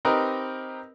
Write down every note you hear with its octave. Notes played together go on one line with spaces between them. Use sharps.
C4 D#4 G4 A#4 B4 D#5